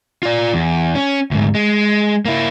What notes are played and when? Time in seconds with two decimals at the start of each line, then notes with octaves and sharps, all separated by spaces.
0.23 F4 D5
0.54 E2
0.95 C#4
1.31 D2 G#2
1.55 G#3
2.25 A#3 E4